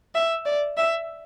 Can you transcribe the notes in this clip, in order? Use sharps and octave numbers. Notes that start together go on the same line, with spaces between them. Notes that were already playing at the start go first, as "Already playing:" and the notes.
E5
D5
E5